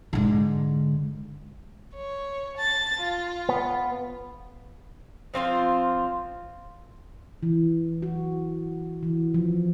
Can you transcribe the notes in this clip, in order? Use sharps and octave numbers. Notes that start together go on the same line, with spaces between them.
G#2 D3
C#5
A5 A6
F4
B3
F3 C4 F4 C5
E3
F#4
E3
F3